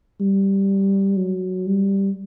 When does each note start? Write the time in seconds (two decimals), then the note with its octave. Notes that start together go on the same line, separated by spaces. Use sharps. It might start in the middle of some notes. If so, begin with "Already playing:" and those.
0.20 G3
1.17 F#3
1.67 G3